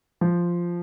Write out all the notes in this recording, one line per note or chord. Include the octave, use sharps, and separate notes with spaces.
F3